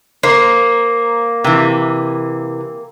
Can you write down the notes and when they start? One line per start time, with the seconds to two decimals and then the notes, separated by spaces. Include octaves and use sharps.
0.23 A#3 C5
1.44 C3 E3